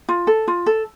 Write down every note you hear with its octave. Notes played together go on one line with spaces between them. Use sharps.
F4
A4
F4
A4